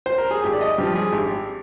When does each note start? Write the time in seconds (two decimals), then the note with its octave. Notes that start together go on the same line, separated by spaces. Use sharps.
0.06 C5
0.18 A#4
0.31 G#4
0.44 G#1 G4
0.53 D5
0.61 D#5
0.78 G2 F3 G4
0.95 G#4
1.12 G#1 G4